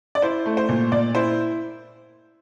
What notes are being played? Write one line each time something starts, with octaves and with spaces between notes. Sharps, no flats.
D5
E4 C5
A3
C5
A#2
A#2 D5
E4 C5